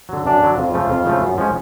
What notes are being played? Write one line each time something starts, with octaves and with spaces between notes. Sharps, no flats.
D3 F#3
F#2 D4
D3 F#3
F2 F4
C#3 F3 A3
F2
C#3 F3 A3
F#2
F3 G#3 C#4